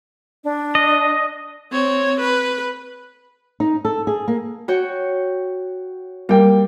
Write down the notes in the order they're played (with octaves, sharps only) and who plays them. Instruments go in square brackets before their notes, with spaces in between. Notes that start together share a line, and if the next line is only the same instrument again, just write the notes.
[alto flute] D4
[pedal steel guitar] D#5
[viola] C4 C#5
B4
[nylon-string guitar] D#4
A4
G#4
A#3
[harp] F#4 C#5 G5
[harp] G3 [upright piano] A#3 G5